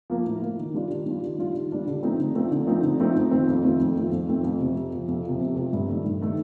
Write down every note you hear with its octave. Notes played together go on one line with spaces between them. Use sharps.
F3 A#3
A2
F3 A#3
D#3
G3 D4 F4
D#3
G3 D4 F4
D#3
G3 D4 F4
D#3
G3 D4 F4
D3
F3 A3 C4 D#4
D3
F3 A3 C4 D#4
D3
F3 A3 C4 D#4
D3
F3 A3 C4 D#4
F2
D#3 A3 C4 F4
F2
D#3 A3 C4 F4
F2
D#3 A3 C4 F4
F2
D#3 A3 C4 F4
F2
C3 F3
F2
C3 F3
F2
C3 F3
F2
C3 F3
G2
D#3 A3
G2
D#3 A3